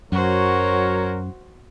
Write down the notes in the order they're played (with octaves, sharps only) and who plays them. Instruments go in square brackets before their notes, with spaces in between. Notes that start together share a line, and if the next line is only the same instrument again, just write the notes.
[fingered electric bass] F#2 [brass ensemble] F#3 A#4 C#5 [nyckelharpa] F#4 C5